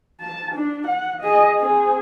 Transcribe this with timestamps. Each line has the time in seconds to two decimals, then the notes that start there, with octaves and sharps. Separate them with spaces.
0.21 A5
0.55 D4
0.87 F#5
1.22 G#4 D#5
1.58 C4 G#4